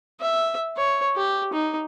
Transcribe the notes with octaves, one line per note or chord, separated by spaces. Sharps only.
E5
C#5
G4
D#4